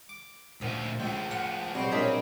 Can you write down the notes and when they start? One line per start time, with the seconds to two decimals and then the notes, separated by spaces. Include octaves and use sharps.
0.09 D6
0.61 D2 A#2 F3 E5
1.00 G#3 A3 F4 G5
1.31 F3 F#5
1.75 A#1 B2 F#3 G3 C4 F#4 C#5
1.92 A#2 C#4 D4 E4 C5 D#5